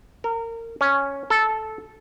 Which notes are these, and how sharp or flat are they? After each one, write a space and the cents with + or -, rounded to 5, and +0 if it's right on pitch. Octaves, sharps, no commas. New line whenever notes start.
A#4 -25
C#4 +0
A4 -10